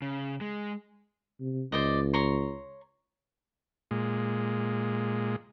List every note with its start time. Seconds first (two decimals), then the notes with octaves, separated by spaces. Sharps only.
0.02 C#3
0.41 G#3
1.41 C3
1.72 C#2 C5 D5 D#5
2.14 C#5 A#5 C6
3.91 A#2 G#3